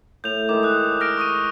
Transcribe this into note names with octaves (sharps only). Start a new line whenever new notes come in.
A2 G6 F7
D#3 G#3 D6
D#6 F#6
F6 A#6 D7
C#6 D#6 D#7